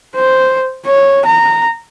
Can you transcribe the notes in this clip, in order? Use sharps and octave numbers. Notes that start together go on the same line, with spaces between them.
C5
C#5
A#5